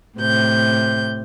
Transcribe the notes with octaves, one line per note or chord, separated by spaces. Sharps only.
A2 C3 G6